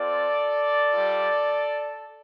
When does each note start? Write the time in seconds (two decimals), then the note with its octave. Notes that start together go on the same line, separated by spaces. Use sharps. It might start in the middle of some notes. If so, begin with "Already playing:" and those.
Already playing: C4 F4 A4 D5
0.92 G3 F4